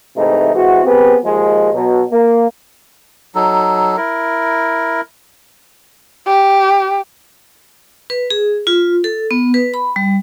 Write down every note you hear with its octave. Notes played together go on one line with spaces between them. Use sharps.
G#2 C3 E3 A3 D#4
E3 G#3 C4 F#4
B3 C4 G4 G#4 B4
D#2 F3 G#3
B2 F#3
A#3
F#3 D#4 A4
E4 A#4
G4
B4
G#4
F4
A4
B3
B4
B5
G3